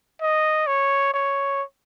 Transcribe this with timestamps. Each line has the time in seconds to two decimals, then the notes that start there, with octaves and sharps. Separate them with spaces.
0.22 D#5
0.67 C#5
1.14 C#5